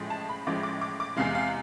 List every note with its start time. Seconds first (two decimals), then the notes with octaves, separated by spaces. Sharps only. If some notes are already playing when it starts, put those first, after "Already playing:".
Already playing: A1 A2 F3 G#3
0.10 A5
0.29 B5
0.47 A1 A2 F3 G#3 D6
0.63 D6
0.81 D6
1.00 D6
1.17 E2 C3 G#3 F5
1.35 F5